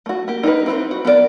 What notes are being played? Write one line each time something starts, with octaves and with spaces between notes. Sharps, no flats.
A3 F#4
A#3 G4
D#4 E4 G4 A#4 B4
C4 E4 F#4 B4 C5
F#4
B3 A#4 B4 D5